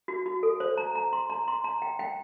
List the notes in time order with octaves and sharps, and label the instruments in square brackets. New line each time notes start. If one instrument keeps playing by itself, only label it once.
[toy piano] F#4
F#4
A4
C5
A#5
A#5
C6
A#5
C6
A#5
G5
G5